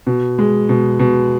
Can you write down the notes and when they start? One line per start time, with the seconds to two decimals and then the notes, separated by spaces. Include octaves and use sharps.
0.07 B2
0.39 G#3
0.69 B2
0.99 B2